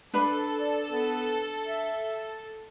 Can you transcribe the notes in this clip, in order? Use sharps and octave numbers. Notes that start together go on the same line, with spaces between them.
D4 A4 B4 B5
D5
B3
E5